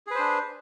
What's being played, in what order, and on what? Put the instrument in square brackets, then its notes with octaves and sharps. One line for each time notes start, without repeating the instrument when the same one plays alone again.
[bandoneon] G#4
B4
C5
D4